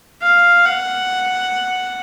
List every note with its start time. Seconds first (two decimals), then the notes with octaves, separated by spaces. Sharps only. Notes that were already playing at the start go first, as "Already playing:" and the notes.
0.22 F5
0.65 F#5